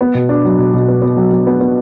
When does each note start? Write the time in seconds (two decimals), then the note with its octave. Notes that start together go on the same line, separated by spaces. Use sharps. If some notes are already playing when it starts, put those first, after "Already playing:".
0.01 B3
0.15 B2
0.29 D4
0.45 F#3
0.58 B2
0.74 B2
0.88 B3
1.02 B3
1.17 F#3
1.31 F#3
1.47 B3
1.60 B3